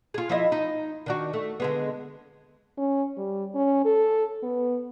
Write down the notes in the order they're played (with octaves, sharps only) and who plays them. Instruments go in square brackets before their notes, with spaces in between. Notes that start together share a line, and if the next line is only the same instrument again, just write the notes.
[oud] F4 G#4
F3 E4 D#5
D#4
D#3 D4 F#4
A3
D3 G#3 B3
[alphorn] C#4
G3
C#4
A4
B3